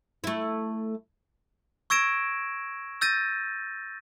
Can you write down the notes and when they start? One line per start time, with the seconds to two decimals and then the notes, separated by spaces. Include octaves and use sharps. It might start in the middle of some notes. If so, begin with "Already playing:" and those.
0.24 A3 E4
1.90 C#6 E6 G#6 A#6 D7 E7
3.01 E6 G6 A6 A#6 D#7